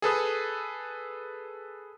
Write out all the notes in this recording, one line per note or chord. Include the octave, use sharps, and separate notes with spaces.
G#4 A4 B4 D#6